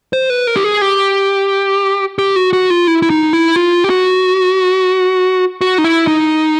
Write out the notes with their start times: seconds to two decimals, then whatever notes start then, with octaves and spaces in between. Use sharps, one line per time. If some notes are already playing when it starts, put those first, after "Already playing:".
0.13 C5
0.30 B4
0.47 A#4
0.56 G4
0.64 G#4
0.81 G4
2.19 G4
2.36 F#4
2.53 F#4
2.70 F4
2.87 E4
3.02 E4
3.10 D#4
3.33 E4
3.56 F4
3.84 G4
3.90 F#4
5.61 F#4
5.78 D#4
5.84 E4
6.07 D#4